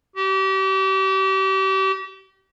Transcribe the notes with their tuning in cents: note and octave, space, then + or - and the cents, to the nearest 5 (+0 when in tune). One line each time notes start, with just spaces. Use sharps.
G4 -35